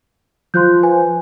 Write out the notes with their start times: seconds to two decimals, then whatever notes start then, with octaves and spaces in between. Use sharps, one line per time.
0.54 F3 C6 F#6 G6
0.83 B4 G#5